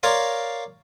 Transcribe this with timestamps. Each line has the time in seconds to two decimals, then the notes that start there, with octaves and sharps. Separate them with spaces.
0.03 A#4 C#5 D5 F5 C6